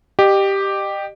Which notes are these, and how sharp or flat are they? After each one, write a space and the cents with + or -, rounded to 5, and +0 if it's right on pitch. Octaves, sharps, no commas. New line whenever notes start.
G4 +0 D#5 -35